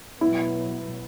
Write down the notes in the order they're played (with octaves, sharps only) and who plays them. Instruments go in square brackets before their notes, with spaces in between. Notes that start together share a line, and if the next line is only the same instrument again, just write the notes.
[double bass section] B2 F#3 B3 [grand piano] E4